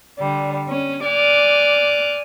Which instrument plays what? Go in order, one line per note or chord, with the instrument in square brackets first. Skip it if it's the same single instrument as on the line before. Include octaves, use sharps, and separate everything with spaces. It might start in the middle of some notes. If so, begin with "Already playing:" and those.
[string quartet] D3 G3
C#4
D5 G#5 D6 F6 F#6